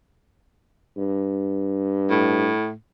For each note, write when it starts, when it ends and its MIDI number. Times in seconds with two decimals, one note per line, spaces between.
0.97 2.50 43
2.10 2.72 45